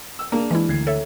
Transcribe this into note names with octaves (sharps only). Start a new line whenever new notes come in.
E6
A#3 D4 G#4
E3 G#3 E4
D2 G#6 C7
A4 C#5 E5